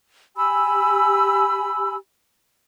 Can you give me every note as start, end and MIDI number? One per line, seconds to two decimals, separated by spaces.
0.36 1.95 67
0.36 1.95 80
0.36 1.95 83
0.36 1.95 88